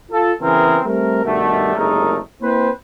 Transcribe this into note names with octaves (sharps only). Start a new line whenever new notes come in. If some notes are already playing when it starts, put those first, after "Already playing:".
F4 A4
C#3 E3 B3 C4 G#4 A#4
G3 A3 C4 A#4
G2 B2 D#3 G3 A3
F#1 C3 G#3 A3 D#4 A#4
A#3 C4 E4 B4 C5